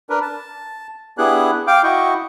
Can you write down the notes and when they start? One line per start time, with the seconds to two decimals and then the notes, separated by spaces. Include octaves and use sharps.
0.10 D4 A#4 B4
0.22 A5
1.18 B3 D4 E4 G4 G#4 F#6
1.67 F5 G5 D6
1.84 E4 F#4 D#5 G5 C#6